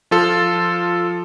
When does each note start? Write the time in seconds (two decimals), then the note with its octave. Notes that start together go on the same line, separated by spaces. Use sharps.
0.11 F3 F4 A4